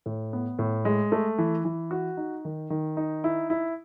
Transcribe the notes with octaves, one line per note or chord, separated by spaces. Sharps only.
A2
B3
A2
G#3
A3
E3
E3
F#4
D#4
D#3
D#3
D#4
E4
E4